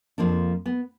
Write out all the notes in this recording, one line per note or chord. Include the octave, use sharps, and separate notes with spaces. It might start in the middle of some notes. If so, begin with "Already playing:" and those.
F2 F3 A#3 D4
B3